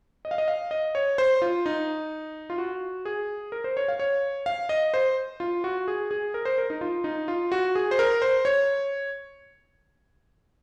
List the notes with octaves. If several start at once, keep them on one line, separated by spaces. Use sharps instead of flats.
D#5
F5
D#5
F5
D#5
C#5
C5
F4
D#4
F4
F#4
G#4
A#4
C5
C#5
F5
C#5
F5
D#5
C5
F4
F#4
G#4
G#4
A#4
C5
A#4
D#4
F4
D#4
F4
F#4
G#4
C5
A#4
C5
C#5